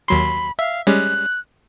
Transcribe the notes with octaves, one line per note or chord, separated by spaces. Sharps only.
D#2 F#3 B5 C6
E5 F5
G3 G#3 C#4 F#6